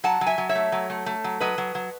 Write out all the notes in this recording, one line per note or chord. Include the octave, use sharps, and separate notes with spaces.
F#3 F#5 A5
F#3
E5 G#5
F#3
C#5 E5
A3
F#3
A3
A3
F#3
F#3 B4 D#5
F#3
F#3